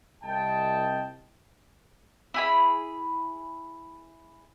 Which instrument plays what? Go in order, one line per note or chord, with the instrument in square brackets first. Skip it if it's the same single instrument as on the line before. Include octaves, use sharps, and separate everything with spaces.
[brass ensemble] C2 D#5 G5 A5
[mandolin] E4 G#4 B5